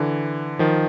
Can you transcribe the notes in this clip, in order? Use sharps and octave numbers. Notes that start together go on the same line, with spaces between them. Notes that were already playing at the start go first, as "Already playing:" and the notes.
Already playing: D3 E3
D#3 F3